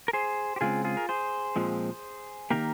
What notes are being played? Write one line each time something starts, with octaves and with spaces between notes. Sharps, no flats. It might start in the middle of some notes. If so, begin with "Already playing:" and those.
A#4
G#4 C5
G4
C#3 G#3 C4 F4 G#4
F4 G#4
A#4
G#4 C5
A#2 F3 G#3 C4
C3 D#3 A#3 G4 A#4